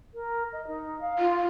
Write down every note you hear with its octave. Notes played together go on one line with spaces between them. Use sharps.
A#4
D#5
D#4
F5
F4